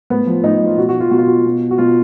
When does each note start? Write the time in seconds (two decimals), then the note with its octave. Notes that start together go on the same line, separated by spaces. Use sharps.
0.10 A2 B3
0.27 F3
0.43 A2 D#4
0.61 F3
0.67 F4
0.77 B2 F#4
0.89 F#4
1.00 F4
1.11 B2 F#4
1.18 F4
1.27 F#4
1.45 B2
1.71 F#4
1.78 B2 F4